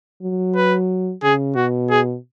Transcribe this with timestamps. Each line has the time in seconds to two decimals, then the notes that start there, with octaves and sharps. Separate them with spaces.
0.22 F#3
0.56 B4
1.23 C#3 G#4
1.56 B2 F#4
1.90 G#4